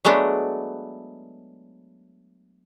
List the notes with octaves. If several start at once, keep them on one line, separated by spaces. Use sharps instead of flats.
F#3 G#3 A3 B3 D4